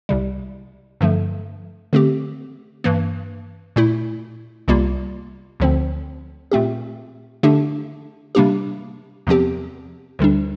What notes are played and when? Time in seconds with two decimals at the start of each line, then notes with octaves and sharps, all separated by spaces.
0.09 C2 C3 G3
1.01 G2 D3 F3 A3
1.93 D3 A3 C4 G4
2.84 G2 E3 A#3
3.76 A#2 A3 E4
4.68 C2 C3 G3 A#3 F4
5.60 D2 D3 F3 C4
6.52 A#2 A3 C4 G4
7.43 D3 A3 D4 G4
8.35 C3 G3 A#3 D4 G4
9.27 E2 C3 F3 C4 G4
10.19 D2 D3 G3 D4